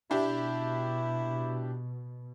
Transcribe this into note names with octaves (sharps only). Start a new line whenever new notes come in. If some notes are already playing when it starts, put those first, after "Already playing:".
B2 D4 E4 G4 E5